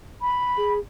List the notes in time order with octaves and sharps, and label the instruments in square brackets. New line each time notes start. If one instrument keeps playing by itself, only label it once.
[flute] B5
[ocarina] G#4